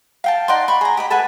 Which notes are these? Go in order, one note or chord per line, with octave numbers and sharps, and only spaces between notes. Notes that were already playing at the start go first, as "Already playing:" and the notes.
F5 G5 A5
D#4 D5 F#5 C6
B5 C#6
G#4 A#5
G4 D#5 B5
A4 B4 F#5 G#5